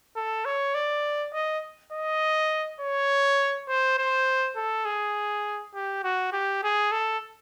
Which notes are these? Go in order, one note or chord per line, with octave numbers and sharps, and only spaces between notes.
A4
C#5
D5
D#5
D#5
C#5
C5
C5
A4
G#4
G4
F#4
G4
G#4
A4